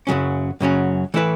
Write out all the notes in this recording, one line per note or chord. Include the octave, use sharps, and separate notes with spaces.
F#2 C#3 F#3 C#4
F#2 C#3 F#3 C#4
E3 A3 E4 B4